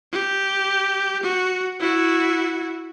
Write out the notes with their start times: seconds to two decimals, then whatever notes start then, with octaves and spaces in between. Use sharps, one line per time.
0.12 G4
1.23 F#4
1.80 E4 F#4